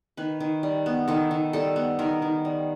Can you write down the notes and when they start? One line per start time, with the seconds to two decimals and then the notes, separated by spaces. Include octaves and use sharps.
0.17 D#3 B4
0.40 D#3
0.63 G3
0.86 B3
1.08 D#3 A4
1.31 D#3
1.53 G3 A4
1.76 B3
1.99 D#3 A#4
2.22 D#3
2.45 G3